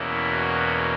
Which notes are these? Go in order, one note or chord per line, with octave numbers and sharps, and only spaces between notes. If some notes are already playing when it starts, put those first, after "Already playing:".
Already playing: E2 B2 A#3 C#4 E4
F#4